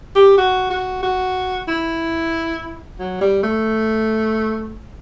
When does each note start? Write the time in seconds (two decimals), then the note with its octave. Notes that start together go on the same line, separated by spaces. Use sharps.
0.16 G4
0.38 F#4
0.70 F#4
1.03 F#4
1.68 E4
2.99 F#3
3.21 G3
3.43 A3